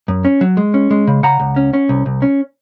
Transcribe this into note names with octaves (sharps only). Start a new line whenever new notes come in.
F#2
C#4
F#3
G#3
C#4
G#3
C#3
C#3 F#5 A#5
C#2
C#4
C#4
C2
C2
C#4